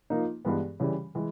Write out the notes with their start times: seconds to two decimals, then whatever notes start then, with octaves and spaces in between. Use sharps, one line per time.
0.10 F3 A#3 D#4
0.45 G2 E3 G#3 B3
0.80 C#3 E3 G3
1.15 E3 G#3